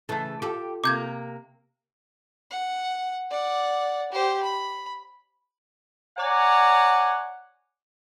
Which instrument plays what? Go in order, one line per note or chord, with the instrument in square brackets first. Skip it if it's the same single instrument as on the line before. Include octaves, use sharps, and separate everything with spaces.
[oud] C#3 E3 [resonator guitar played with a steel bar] A3 A4
[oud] F4 A4 [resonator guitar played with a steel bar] G4 G5
[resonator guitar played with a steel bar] C3 A#3 [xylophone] D6 G6 G#6
[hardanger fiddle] F#5
D5 F#5
G4 C5
B5
[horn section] C#5 D5 F#5 G#5 A#5